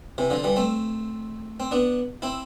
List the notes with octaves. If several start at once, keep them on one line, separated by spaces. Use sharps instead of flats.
C3 E3
D3 F3
E3 G3
A3 C4
C4
B3 D4
C4 E4